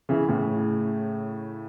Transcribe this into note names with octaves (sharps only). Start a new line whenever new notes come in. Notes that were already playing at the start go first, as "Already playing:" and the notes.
C#3 E3
A2 C#3